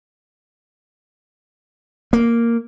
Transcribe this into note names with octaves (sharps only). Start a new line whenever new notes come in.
A#3